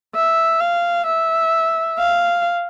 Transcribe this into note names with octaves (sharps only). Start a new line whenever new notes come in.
E5
F5
E5
F5